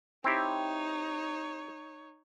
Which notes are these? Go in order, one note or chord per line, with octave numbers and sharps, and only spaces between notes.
C4 D#4 E4 G4 C#5